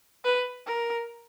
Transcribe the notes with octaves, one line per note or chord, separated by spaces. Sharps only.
B4
A#4